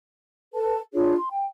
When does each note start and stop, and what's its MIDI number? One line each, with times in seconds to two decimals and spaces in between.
0.53 0.78 69
0.53 0.78 71
0.53 0.78 81
0.93 1.14 62
0.93 1.14 65
0.93 1.14 68
0.93 1.14 73
1.16 1.28 84
1.30 1.45 79